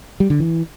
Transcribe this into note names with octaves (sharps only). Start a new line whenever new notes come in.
G3
D3
E3